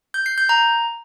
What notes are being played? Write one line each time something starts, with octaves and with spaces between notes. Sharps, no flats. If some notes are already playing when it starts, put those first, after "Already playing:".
G6
C7
G6
A#5